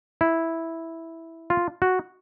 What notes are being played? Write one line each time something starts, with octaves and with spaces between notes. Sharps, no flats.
E4
F4
F#4